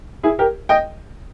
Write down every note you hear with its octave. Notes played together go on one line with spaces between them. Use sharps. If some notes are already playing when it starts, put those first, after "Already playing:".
E4 G#4
G4 A#4
D#5 G5